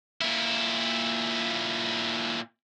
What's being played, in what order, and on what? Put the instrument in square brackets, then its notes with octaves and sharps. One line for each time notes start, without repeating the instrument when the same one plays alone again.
[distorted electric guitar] A#2 E4